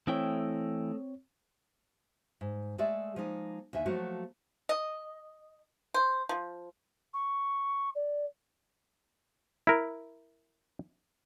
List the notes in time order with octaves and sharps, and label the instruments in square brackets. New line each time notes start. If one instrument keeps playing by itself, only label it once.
[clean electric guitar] E3 E4 G5 [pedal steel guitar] A3 D#5 [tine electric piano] C4 C#5
[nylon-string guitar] G#2
G#3 A3 G#4 D5 E5
F3 G#3 A#3 D#4
D#2 D3 E5 G#5
F3 F#3 A3 A#3 F#4
[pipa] D#5
C5
F3
[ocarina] C#6
D5
[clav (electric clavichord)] E4 A#4